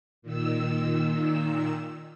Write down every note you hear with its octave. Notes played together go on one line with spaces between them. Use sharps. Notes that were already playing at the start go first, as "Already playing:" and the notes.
A#2 D#3 E6